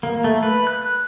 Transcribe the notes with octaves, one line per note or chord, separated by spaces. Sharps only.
A#3
A3
B4
F#6